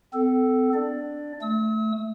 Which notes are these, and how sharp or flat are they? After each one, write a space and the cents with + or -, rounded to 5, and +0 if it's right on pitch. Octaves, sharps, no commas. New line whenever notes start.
C4 -45 A4 +0
D4 +0 D5 +15
A3 +0 E6 -45